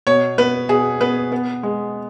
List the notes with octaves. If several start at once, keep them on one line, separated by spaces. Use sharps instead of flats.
B2 C#5
B3 B4
B2 G#4
B3 B4
B3
G#3